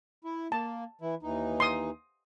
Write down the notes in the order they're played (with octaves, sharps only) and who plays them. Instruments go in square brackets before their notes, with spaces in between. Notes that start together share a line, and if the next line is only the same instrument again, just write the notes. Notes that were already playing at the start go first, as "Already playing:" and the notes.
[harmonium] E4
[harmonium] A#3 [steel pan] A5
[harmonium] E3 E4
D#2 E3 D#4
[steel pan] C6 D#6